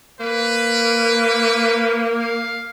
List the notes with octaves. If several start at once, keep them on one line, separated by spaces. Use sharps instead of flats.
A#3 B4
F5